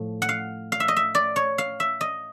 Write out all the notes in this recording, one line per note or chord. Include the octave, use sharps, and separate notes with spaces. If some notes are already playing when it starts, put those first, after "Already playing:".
Already playing: A2 F3
F#5
F5
F5
E5
D#5
E5
D5
C#5
F5
E5
D#5